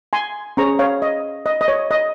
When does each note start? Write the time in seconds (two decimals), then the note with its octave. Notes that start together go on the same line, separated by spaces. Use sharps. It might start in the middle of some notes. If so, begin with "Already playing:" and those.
0.13 G#5 C6
0.57 C#4 G#4 C5 A#5 C#6
0.79 C#5 F5
1.02 D#5
1.46 D#5
1.61 D#5
1.68 C#5
1.91 D#5